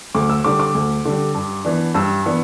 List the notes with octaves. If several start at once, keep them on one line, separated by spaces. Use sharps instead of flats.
D2 D6
E6
D3 G3 D6
D6
D2
D3 G3
G2
E3 B3 D4
G2 E6
E3 B3 D4